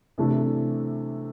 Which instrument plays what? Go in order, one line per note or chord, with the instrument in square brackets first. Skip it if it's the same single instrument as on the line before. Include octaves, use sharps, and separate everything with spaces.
[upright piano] C3 E3 A3 D4